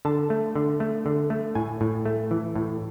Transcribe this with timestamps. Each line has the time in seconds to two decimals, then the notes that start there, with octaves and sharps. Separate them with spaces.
0.05 D3 A5
0.30 A3
0.55 D3
0.80 A3
1.06 D3
1.30 A3
1.55 A2 G#5
1.81 A2
2.06 A3
2.31 E3
2.56 A2